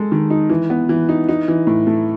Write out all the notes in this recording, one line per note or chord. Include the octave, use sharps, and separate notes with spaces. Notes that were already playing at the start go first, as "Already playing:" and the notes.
Already playing: G#3 A4
D#3
D#4
E3
B3
E3
D#4
D#4
E3
A2
A3